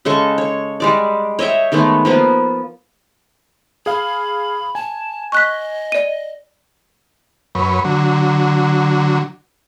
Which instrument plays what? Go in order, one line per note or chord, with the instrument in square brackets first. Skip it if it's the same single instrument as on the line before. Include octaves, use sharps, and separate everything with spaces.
[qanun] C#3 G#3 A4 C#6
C#5
G3 G#3 D5
C#5 D#5 E5 G5
D#3 G#3 A3 B3
F3 A#3 B3
[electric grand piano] G#4 F5 [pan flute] B5
[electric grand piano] G#5 [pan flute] A5
[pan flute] D#5 [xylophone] C#6 F#6 B6
[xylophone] D5 D#7
[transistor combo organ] F#2 B4 C#5
D3 F#3